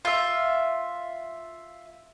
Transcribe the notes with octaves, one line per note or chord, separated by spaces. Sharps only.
F4 E5